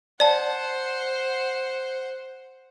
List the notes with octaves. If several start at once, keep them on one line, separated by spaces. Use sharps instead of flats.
C5 D5 F#5 A5